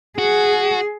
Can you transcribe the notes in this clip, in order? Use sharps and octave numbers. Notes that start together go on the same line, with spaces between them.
F#4 G#4